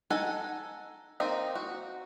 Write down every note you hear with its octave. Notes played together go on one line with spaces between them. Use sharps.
D#4 A4 F#5 G#5
A#3 C4 D#4
F#4